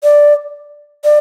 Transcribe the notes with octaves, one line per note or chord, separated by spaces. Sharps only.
D5
D5